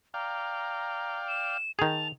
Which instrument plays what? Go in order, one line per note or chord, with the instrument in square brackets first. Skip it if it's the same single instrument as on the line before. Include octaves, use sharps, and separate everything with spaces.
[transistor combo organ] D5 F5 G5 [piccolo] A#5
[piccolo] E7
[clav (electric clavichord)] D#3 G#4 [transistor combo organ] A5 [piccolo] F7